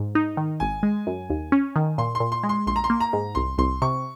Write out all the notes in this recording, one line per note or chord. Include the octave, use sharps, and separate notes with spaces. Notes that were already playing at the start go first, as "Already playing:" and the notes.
Already playing: G#2
D#4
D#3
G#1 G#5
G#3
F#2
D#2
C#4
D#3
A#2 C6
C6
A#2
C6
G#3
C6
A#1 C6
A#5
C6
A#3
A#5
G#2
C2 C6
C2 C6
C3 C#6